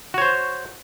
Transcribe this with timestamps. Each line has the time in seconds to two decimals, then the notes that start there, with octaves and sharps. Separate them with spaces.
0.14 F#4
0.18 C#5
0.22 C5